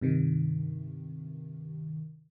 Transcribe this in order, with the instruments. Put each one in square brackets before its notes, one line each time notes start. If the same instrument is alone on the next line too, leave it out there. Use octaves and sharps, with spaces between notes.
[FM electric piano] G2 C3 D#3